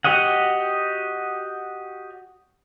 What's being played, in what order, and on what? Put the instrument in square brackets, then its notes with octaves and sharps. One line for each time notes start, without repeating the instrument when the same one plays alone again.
[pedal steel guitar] F#4 G4 C#5 D#5 F#5